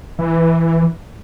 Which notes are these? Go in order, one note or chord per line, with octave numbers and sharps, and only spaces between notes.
E3